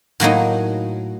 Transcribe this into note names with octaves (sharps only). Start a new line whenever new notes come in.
A2 F#3 A#3 D#4